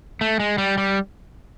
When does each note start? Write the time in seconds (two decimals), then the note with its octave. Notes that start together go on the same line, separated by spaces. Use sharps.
0.21 A3
0.40 G#3
0.58 G3
0.78 G3